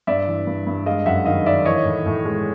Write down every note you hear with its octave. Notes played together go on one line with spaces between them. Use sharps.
G2 D5 E5
E3
G2
G2
G#3 D#5 F5
F#2 E5 F#5
D#3 D#5 F5
D#3 D5 E5
E3 C#5 D#5
A2
A2
G#3